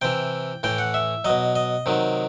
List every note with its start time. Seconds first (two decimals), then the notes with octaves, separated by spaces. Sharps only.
0.02 C3 E3 G5
0.63 A2 E3 G5
0.78 F#5
0.94 E5
1.25 B2 F#3 D#5
1.55 D#5
1.86 C3 D#3 F#3